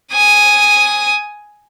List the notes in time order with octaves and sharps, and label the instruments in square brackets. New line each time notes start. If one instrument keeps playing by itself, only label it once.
[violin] G#5 D#6